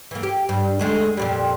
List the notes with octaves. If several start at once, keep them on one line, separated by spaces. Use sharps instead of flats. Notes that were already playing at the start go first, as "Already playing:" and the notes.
E3 A#3
G4
G2
D2 G#3 A3
F2 A#2 G3